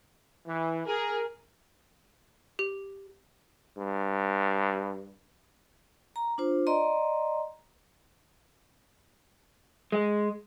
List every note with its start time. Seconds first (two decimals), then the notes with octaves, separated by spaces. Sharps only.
0.47 E3
0.86 G#4 A#4
2.59 G4
3.77 G2
6.16 A#5
6.38 D4 F4 C5
6.67 D5 D#5 A#5 C6
9.92 G#3